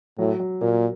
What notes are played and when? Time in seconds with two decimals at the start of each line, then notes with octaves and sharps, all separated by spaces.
0.19 A2 F#3
0.40 F#3
0.61 A#2 A#3